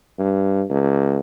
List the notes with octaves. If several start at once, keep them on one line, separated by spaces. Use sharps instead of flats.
G2
C#2